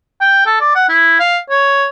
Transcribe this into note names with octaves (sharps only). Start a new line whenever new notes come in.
G5
A4
D5
F#5
E4
F5
C#5